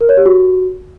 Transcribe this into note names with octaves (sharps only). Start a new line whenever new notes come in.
A#4
C#5
G4
F#4